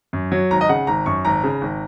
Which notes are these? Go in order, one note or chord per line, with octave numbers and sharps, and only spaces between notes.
F#2
F#3
G#1 A#5
D#5
C#3 F#5
G#1 A#5
F#2 C#6
G#1 A#5
C#3
G#1